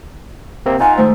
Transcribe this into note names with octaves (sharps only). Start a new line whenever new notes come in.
C3 A#3 C4
D#4 F4 F#5 G#5
G#2 D#3 A3 C5